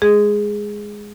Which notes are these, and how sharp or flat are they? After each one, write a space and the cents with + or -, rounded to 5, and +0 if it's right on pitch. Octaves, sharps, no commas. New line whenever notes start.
G#3 +0 G#4 +0